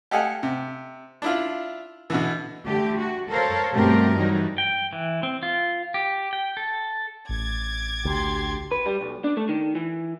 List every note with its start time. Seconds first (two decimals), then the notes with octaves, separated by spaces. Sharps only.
0.11 G4 A4 D#5 F5 F#5 G#5
0.43 C3
1.22 D4 E4 F4
2.10 B2 D3 E3
2.65 D3 A3 G4
2.98 F#4
3.30 A4 A#4 C5 C#5 F5
3.73 G2 B2 A3 C4 G4 A#4
4.17 E3 F#3 G3 D#4
4.58 G5
4.93 E3
5.23 C4
5.43 F4
5.94 G4
6.33 G5
6.57 A4
7.29 A1 D6 G#6 A6
8.05 D2 G4 C6
8.71 B4
8.86 G3
9.01 B1
9.24 D4
9.37 A3
9.49 D#3
9.75 E3